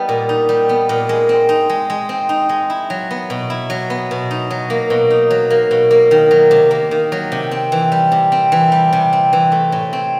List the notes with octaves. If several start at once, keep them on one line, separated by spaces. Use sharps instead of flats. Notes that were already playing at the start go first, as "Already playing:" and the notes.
Already playing: G3 B3 D#4
A#2
D#4
G3
B3
A#2
G#3
C4
D#4
G#3
G#3
C4
D#4
G#3
E4
F#3
B3
B2
E4
F#3
B3
B2
D#4
F#3
A#3
B2
D#4
F#3
A#3
B2
A#3
D#3
F#3
C3
A#3
D#3
F#3
C3
C4
E3
G3
C3
C4
E3
G3
C3
C4
E3
A3
A2
C4